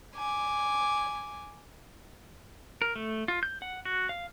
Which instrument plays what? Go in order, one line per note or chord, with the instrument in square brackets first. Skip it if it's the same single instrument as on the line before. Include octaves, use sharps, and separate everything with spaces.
[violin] G#5 D6
[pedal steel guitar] A#4
A3
F4
G6
F#5
F#4
F5